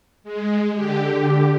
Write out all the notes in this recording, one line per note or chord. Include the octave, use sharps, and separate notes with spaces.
G#3
D3 G4